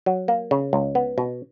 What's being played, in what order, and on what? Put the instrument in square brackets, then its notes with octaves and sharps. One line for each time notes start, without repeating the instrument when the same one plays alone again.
[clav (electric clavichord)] F#3
A#3
C#3
C#2
B3
B2